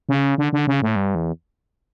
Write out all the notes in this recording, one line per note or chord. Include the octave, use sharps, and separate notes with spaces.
C#3
D3
D3
C#3
A2
G2
E2